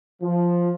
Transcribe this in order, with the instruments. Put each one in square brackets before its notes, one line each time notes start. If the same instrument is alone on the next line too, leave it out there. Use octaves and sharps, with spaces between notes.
[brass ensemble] F3